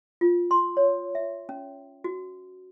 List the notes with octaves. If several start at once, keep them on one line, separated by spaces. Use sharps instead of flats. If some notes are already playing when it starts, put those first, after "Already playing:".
F4
C6
C#5
E5
C#4
F#4